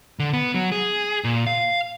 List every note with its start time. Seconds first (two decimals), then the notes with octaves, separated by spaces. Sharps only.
0.19 D3
0.33 B3
0.54 F#3
0.72 G#4
1.24 A#2
1.47 F5